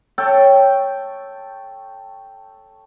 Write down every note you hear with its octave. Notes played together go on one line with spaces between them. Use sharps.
A4 C#5 G5